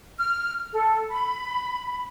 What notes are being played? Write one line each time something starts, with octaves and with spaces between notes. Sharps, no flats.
F6
A4
B5